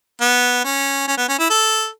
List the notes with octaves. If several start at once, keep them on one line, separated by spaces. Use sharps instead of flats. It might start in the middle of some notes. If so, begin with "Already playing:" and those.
B3
C#4
C#4
B3
C#4
E4
A4